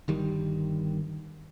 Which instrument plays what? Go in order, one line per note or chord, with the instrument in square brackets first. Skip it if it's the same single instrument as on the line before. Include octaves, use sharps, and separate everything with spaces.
[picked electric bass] G1 D#3 G3